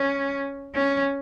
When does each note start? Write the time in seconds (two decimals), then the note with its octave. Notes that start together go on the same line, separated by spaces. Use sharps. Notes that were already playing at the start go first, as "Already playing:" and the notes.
Already playing: C#4
0.75 C#4